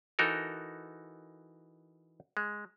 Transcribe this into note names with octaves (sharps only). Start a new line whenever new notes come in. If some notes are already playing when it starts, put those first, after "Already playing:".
E3 D#4 F#4 A4 A#4
G#3